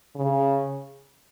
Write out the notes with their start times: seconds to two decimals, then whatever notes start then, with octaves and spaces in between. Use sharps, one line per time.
0.15 C#3